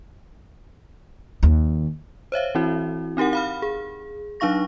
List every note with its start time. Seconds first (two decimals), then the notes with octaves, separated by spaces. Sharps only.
1.43 D#2
2.32 C5 C#5 E5 F5
2.55 E3 C4 E4 F#4
3.17 C4 D#4 G4 A#4 F#5
3.33 F5 B5 F6
3.62 G#4
4.40 F#3 D4 D#4 F5 C#6 A#6